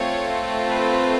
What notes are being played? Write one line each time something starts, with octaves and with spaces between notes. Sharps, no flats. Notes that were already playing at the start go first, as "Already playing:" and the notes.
Already playing: A3 C4 F4 C#5
B4